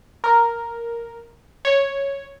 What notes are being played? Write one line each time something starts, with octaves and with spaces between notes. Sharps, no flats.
A#4
C#5